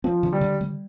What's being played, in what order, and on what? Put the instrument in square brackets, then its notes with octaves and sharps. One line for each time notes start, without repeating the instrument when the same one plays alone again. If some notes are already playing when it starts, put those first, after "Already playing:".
[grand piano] F3 [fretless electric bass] C4
[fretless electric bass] D3
[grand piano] G3
[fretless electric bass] D3
G3